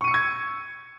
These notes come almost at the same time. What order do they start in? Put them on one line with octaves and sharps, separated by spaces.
C#6 D#7 C#7 E6 G#6